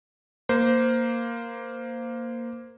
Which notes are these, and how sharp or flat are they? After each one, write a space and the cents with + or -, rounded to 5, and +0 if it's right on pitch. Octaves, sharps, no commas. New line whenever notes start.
A#3 +0 C5 -15